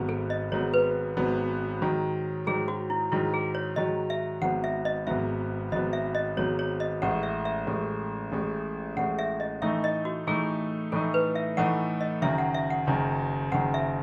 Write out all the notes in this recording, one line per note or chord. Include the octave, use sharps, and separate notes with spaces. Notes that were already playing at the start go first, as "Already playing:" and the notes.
Already playing: G#1 G#2 F#3 B3
A4
D#5
G#1 G#2 F#3 B3 C#5
B4
G#1 G#2 F#3 B3
G#2 D#3 F#3
G#2 D#3 F#3 G#4
F#4
E4
G#2 D#3 F#3 E4
G#4
C#5
G#2 D#3 F#3 D#5
E5
G#1 G#2 F#3 B3 F#5
E5
D#5
G#1 G#2 F#3 B3 E5
G#1 G#2 F#3 B3 D#5
E5
D#5
G#1 G#2 F#3 B3 C#5
C#5
D#5
A1 A2 G#3 F#5
E5
E5
A1 A2 G#3
A1 A2 G#3
A1 A2 G#3 F#5
E5
D#5
A2 E3 A3 D#4 E5
D#5
F#4
A2 E3 A3 D#4 G#4
A2 E3 A3 D#4 A4
B4
E5
A2 E3 A3 D#4 F#5
D#5
F#1 F#2 D#3 E5
F#5
E5
F#5
F#1 F#2 D#3
F#1 F#2 D#3 F#5
E5